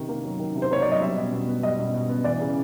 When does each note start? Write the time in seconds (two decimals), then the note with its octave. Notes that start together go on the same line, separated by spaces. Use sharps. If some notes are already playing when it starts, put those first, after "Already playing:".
Already playing: C3 D#3
0.09 A#3
0.24 F#3
0.39 D#3
0.55 C3
0.62 C5
0.71 A#3 C#5
0.82 F#3 D5
0.91 D#5
1.01 G3 E5
1.18 B2
1.32 B2
1.48 B3
1.63 G3 D#5
1.79 B2
1.94 B2
2.09 B3
2.24 E3 D5
2.41 C#3